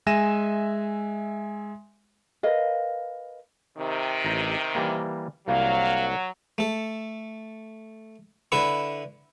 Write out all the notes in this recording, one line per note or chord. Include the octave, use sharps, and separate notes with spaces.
G#3 E5 G#5 A#6 D#7 E7
A#4 B4 D#5 F5
C3 D#3
A1 A#5
E3 G3 A#3
C2 F#3 A#3 F5
A3 A4
D3 E4 B4 E5 C#6